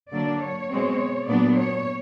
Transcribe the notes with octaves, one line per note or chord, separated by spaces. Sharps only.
D3 F#3 A#3 D4 D5
C#5
B2 G#3 C4
A#2 F#3 B3 D4 D5
C#5